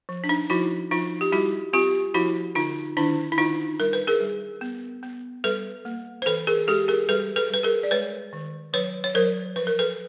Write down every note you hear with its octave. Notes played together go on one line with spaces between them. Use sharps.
F3
D4
D#4
F3 E4 F#4
F3 D#4 F4
G4
G3 E4 F#4
C4 F4 G4
F3 E4 F#4
D3 D#4 F4
D#3 D4 E4
E4
D#3 D#4 F4
G3 A#4
B4
G#4 A#4
G3
B3
B3
G3 A4 B4
A#3
C5
E3 A4 B4
G#4 A#4
G#3 G4 A4
G#4 A#4
G3 A4 B4
A4 B4
G3 B4
G#4 A#4
D5
G#3 B4 C#5
D#3
F#3 B4 C#5
C#5
F#3 A#4 C5
F3 B4
A#4
A4 B4